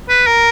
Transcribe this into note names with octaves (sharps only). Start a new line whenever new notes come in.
B4
A#4